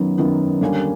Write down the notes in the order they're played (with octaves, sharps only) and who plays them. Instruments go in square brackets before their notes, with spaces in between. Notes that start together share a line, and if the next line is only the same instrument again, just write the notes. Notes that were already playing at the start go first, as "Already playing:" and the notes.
Already playing: [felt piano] F#2 D#3 F#3 B3
F#2 D#3 F#3 B3
D#2 D3 G3 A#3 C#4